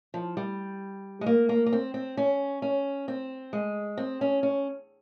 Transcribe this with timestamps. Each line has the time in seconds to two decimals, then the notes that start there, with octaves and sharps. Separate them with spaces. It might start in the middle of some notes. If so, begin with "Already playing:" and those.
0.14 F3
0.37 G3
1.21 G#3
1.26 A#3
1.49 A#3
1.66 A#3
1.73 C4
1.94 C4
2.17 C#4
2.62 C#4
3.08 C4
3.53 G#3
3.98 C4
4.21 C#4
4.43 C#4